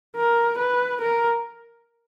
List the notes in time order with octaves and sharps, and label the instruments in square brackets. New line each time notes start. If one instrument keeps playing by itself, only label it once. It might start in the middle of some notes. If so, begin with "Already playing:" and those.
[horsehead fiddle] A#4
B4
A#4